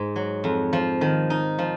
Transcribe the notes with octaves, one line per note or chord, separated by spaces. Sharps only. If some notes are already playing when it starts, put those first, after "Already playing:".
Already playing: G#2
F#3
F2
F3
D#3
D#4
F3